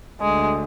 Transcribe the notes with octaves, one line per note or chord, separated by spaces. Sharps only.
D2 D3 G#3